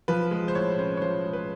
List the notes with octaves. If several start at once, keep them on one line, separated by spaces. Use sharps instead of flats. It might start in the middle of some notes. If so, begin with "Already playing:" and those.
F3 B4
G#3
C5
A2 C#5
C#4 C5
C#5
F3 C5
G#3
B4